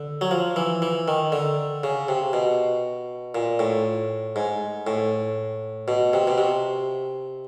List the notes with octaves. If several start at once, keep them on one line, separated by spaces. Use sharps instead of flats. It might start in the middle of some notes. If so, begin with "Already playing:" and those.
Already playing: D3
F#3
F3
E3
E3
D#3
D3
C#3
C3
B2
A#2
A2
G#2
A2
B2
C3
B2
C3